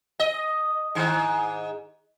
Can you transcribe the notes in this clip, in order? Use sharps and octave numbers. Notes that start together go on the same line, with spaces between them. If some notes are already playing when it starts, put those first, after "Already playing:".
D#5
G#2 D#3